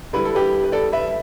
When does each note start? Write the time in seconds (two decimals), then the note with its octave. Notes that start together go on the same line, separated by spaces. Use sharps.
0.13 D3 G3 E4 B4
0.25 A4
0.35 G4 B4
0.64 B4
0.72 A4 D5
0.92 B4 E5